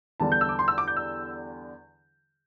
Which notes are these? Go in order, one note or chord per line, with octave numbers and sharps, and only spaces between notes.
E2 D3 G3 A5
G6
E6
D6
C6
E6
D6
G6
E6